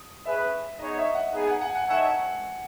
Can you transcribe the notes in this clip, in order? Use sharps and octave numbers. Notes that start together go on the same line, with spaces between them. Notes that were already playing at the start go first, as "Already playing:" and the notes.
Already playing: D#6
C#4 G#4 B4 E5
B3 D#4 G#4 C#5 D#5
E5
F#5
B3 D#4 G#4 F#5
G#5
F#5
G#5
F#5
G#5
F#5
G#5
D#4 A4 C#5 E5 F#5